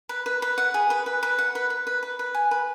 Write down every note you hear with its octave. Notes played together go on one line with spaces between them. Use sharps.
B4
B4
B4
F#5
G#4
B4
B4
B4
F#5
B4
B4
B4
B4
B4
G#5
B4